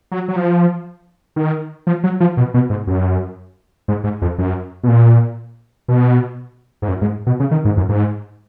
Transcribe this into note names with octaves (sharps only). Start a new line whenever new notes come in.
F#3
F#3
F3
D#3
F3
F#3
F3
B2
B2
G#2
F#2
G#2
G#2
F2
F#2
B2
A#2
B2
G#2
F#2
G#2
B2
C#3
D#3
G#2
F#2
G#2